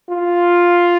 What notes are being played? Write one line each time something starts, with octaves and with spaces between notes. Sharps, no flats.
F4